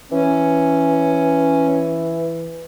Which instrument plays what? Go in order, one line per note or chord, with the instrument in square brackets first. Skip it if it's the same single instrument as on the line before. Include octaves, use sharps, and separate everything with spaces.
[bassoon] E3 [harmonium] C#4